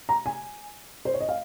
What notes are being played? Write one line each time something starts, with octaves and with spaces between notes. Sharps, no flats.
A#5
G#5
C5
C#5
D#5
F5